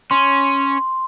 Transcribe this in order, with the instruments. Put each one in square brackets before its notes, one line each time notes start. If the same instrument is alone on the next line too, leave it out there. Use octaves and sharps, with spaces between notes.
[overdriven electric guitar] C#4 [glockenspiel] C6